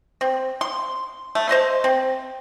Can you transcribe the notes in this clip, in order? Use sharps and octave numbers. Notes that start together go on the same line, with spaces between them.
C4
C6
A3
C5 D#5 C6
C4